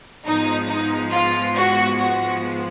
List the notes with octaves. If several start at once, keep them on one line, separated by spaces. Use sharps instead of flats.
G#2 F3 G#3 B3 D#4
D#4
F4
F#4
F#4